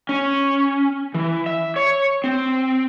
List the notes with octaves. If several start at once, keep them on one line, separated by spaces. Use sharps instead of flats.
C#4
E3
E5
C#5
C4